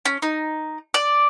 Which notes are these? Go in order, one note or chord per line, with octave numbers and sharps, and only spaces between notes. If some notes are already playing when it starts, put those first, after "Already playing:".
C#4
D#4
D5